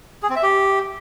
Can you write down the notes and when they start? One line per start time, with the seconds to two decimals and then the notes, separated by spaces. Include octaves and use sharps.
0.23 G#4
0.29 C4
0.36 E5
0.43 G4